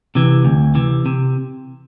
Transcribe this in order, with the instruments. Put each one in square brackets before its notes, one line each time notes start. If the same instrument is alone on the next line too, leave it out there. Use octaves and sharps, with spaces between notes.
[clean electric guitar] C3 E3
D2
C3 E3
C3